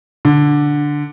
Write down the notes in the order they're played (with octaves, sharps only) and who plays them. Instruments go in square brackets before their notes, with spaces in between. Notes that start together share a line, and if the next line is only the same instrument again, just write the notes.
[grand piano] D3